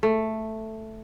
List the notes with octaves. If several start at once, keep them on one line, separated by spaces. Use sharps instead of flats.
A3